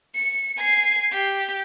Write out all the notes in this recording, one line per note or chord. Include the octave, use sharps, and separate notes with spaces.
C#7
G#5 C7
G4